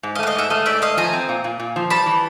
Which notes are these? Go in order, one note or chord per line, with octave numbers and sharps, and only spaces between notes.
G#2
D#5 F5
A3 F#5
D#5 F5
G#2 E5 F#5
A3 D#5 F5
G#2 D5 E5
A3 D#5 F5
F3 G#5 A#5
C4
A#2
A#2
A#2
F3
G3 A5 B5
E3